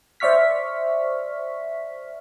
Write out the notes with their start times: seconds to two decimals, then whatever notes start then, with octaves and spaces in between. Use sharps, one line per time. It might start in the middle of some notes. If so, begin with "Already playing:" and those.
0.20 C5 D5 E5 C#6 F6 B6